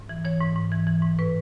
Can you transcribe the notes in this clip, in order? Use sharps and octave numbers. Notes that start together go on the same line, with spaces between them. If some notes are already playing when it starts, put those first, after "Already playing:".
Already playing: G#2
E3
E3 C#5
G#2
G#2
E3
E3
G#2
A2 B4